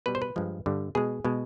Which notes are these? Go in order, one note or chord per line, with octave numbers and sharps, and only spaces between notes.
B2 G3 B4
C5
B4
G2 F3 G#3
G2 D3 G3
B2 G#3 G#4
B2 G#3